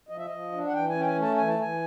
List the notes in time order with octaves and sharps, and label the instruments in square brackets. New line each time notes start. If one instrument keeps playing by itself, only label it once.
[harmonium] F3 D#5
E5
F3 D#5
D4
F#5
E3 G5
C#4 G#5
G5
G#5
A3
A5
E3 G#5
A5
E3 G#5